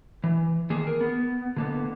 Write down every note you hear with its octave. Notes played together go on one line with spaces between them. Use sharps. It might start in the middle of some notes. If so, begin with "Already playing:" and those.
E3
D#3 A#3 G#4
A#4
B3
D3 A#3 B3